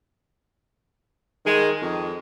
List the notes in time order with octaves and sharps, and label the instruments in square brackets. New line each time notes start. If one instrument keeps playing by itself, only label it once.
[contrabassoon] D#3 [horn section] G#3
[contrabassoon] F2 [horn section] D#3